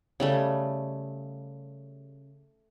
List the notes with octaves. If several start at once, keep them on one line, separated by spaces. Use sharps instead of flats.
C#3 G3 A3